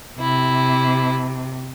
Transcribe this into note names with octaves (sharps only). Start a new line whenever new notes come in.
C3 E4